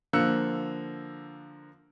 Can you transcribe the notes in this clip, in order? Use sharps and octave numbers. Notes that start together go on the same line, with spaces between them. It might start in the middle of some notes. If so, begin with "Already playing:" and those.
D3 F3 A#3 E6 F#6 C#7